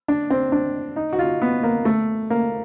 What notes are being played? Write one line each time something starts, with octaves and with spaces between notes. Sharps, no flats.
D4
C4
D4
D#4
F#4
F4
B3
A#3
A3
A#3